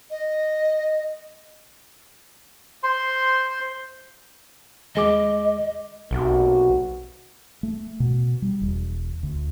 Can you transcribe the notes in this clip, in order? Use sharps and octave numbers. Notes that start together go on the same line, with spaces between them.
D#5
C5 C6
D#2 G#3 D#5 D6
B1 C3 A#3 F#4
A3
B2
G3
E1
D2